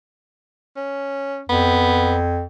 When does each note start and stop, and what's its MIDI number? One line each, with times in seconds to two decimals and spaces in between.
0.77 1.41 61
1.49 2.44 41
1.49 2.16 59